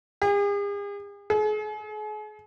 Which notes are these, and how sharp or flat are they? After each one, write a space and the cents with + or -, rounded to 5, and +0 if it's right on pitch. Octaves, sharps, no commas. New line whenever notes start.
G#4 -45
G#4 +40